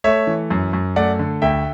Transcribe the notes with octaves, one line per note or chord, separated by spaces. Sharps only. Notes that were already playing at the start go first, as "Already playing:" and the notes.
A3 C#5 E5
E3
F#2
F#2
A3 D5 F#5
D3
D2 E5 G5